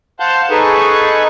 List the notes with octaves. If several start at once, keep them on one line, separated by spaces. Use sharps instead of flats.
C5 F5 F#5 A5 G6
D#4 G#4 A4 B4 C#6